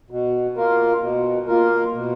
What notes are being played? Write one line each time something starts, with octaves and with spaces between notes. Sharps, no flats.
B2
A#3 F4 A#4
B2
A#3 F4 A#4
B2